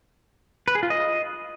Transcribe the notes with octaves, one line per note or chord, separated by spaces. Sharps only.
B4
G#4
F4
D#5